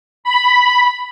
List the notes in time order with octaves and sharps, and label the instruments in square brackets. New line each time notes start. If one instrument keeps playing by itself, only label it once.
[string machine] B5